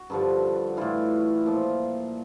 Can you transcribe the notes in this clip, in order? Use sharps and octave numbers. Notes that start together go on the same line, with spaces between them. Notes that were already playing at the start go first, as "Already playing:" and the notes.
Already playing: F#4
G2 D3 F3
A2 E3 F4
A#2 F3